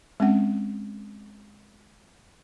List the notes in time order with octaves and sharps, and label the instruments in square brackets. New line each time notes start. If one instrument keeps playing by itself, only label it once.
[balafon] G#3 C4 C#4 F#5